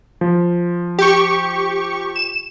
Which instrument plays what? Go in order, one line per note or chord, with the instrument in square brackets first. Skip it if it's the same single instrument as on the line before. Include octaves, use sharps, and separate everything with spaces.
[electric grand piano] F3
[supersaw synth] G4 C#6
E7